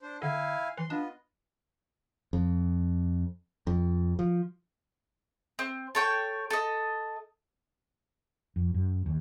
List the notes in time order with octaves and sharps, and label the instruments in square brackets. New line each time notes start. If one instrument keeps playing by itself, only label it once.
[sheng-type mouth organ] D4 C5
[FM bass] D3 [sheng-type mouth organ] E4 F5 G#5
[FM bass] E3 [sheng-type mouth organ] C6
[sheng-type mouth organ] B3 F4 D#5 [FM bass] D4
[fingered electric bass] F2
F2
F3
[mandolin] C4
A4 C#5 G5
A4 D#5
[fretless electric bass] F2
F#2
D#2